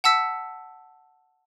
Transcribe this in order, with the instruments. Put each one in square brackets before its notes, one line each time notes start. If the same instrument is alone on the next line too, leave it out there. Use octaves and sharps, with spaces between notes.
[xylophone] F#5 A5 E6 B6 C#7